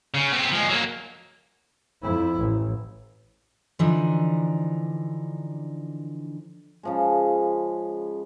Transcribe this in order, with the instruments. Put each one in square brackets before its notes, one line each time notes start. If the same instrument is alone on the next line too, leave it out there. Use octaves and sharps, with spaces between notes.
[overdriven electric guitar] C#3
B3 C4
F3 G#3
F#3 A#3
[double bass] F2 E4
A1
[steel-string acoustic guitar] D3 E3 F3 D4 D#4
[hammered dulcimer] C#3 F3 G#3